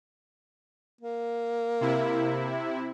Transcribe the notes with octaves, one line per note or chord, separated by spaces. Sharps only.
A#3
C3 E4